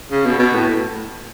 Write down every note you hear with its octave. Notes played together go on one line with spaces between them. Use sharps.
C#3
B2
B2
A2